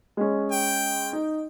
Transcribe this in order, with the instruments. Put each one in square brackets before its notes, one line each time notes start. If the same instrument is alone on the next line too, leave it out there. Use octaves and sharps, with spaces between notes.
[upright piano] G#3 C#4
[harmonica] G5
[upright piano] D#4